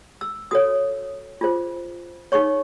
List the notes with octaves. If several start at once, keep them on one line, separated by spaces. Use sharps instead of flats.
E6
F#4 A4 C#5 D#6
F4 G#4 C5
D#4 G#4 C#5 C#6